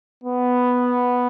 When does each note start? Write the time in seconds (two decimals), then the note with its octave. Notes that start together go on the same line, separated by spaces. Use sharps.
0.23 B3